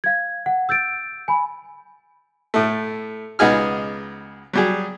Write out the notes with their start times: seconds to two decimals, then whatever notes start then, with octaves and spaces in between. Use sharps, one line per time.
0.04 F5 G#6
0.46 F#5
0.69 E6 G6 A6 D7
1.28 G#5 B5
2.54 A2 A3
3.39 C#2 B3 D#4 G#4 F6
4.53 F#3 G3 G#4